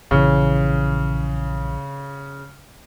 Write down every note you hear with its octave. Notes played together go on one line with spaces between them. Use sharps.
A#1 C#3 E3